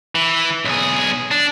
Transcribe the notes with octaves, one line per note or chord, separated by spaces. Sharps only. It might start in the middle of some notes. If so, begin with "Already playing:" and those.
E3
B1 G#4
D4